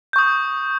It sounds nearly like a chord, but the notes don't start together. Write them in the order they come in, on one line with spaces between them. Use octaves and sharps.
G6 C#6 D#6